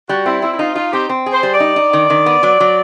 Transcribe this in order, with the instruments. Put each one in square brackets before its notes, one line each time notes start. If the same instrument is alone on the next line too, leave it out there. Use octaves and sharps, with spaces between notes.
[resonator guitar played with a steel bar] G3 [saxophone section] F#4
[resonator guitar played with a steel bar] C4 [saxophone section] E4
[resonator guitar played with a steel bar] C4 [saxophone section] E4
[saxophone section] E4
[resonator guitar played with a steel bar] D#4 [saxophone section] F4
[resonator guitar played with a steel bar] D#4 [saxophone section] F4
[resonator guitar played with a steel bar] C4 [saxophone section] G4
[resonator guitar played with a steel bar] C4
G#4
[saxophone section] C5
[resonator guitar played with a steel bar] G3
[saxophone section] D5
[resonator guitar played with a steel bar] D#4
D#4
D#3
D#3
B3
F#3
F#3